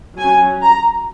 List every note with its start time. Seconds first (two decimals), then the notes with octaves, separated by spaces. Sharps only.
0.18 F#3 C#4 G#5
0.63 A#5